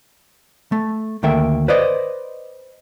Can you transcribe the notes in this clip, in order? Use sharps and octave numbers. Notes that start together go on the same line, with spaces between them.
A3
D2 D#3 A3 A#3 E5 G5
B4 C5 D5 D#5